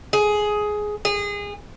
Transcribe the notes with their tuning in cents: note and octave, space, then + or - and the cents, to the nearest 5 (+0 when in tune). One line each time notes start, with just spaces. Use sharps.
G#4 +10
G#4 -25